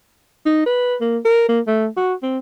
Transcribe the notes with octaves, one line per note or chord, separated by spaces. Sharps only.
D#4
B4
A#3
A#4
A#3
A3
F#4
C4